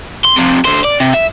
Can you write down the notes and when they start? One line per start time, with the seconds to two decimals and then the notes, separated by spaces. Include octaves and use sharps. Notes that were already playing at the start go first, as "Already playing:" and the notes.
0.25 C6
0.37 F2 C3
0.65 D3 C5
0.84 D5
1.00 C3
1.14 E5